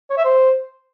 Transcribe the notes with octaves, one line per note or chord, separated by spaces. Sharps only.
C#5
E5
C5